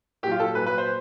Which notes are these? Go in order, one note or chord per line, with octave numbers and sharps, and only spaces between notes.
A#2 F#3 F4 G4
A4
A#2 F#3 B4
B4
C5